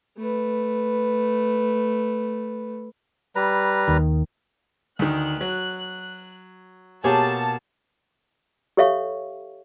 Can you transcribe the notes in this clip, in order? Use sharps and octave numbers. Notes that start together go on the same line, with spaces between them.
A3 B4
G3 B4 A#5
D#2 D#3
D2 D#3 F#6
F#3
B2 A#3 G4 G#4 A#4 C#5 A5
G4 A4 C#5 E5 F5 C#6